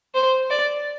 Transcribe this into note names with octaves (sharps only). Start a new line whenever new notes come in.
C5
D5